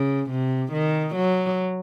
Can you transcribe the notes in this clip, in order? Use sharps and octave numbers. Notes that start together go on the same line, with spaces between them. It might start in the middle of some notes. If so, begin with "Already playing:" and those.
Already playing: C#3
C3
D#3
F#3